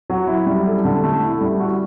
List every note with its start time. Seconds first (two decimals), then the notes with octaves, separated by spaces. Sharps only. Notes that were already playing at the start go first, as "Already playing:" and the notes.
0.10 F#3
0.27 E4
0.47 G3
0.66 A4
0.85 D3
1.03 A3
1.23 E4
1.41 G3
1.60 F#4